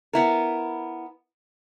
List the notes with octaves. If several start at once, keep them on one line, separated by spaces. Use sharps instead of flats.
B3 E4 A#4